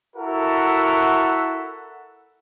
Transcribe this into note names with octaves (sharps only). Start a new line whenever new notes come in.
E4 F#4 A4 A#4 E5 F#5